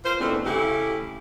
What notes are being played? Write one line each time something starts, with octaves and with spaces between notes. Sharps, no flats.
F4 A#4 C5
E2 B2 A3 C4 D4
C#3 A3 E4 G4